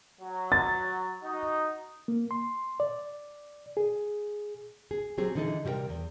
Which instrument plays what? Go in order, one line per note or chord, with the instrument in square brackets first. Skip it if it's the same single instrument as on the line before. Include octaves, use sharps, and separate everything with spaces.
[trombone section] F#3
[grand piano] A6
[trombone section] D#4 F#4
[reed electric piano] A#3
C6
D5
G#4
[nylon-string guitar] G#4
F#3 C4 G4 G#4
D3 E3 D#4 G#4 A4
C3 G3 E4 A#4 G5
E2